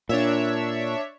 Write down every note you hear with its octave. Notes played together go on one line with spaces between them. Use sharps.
A#2 D4 C#5 E5